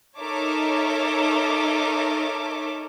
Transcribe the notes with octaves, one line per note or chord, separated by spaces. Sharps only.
D#4 A4 A#4 C#5 E5 D6